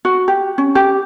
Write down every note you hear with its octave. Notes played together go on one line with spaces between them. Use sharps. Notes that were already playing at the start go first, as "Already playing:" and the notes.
F#4
G4
C#4
G4